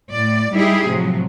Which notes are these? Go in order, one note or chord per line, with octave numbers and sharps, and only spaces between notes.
A2 D5
G3 D#4 E4 G4 G#4
A2 C3 F3 F#3